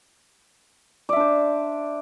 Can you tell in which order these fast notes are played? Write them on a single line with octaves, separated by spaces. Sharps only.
D5 E5 D4 C5